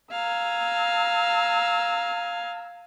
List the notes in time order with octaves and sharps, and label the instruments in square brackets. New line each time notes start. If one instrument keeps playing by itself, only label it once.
[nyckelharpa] F5 G#5 [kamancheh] A#5 E6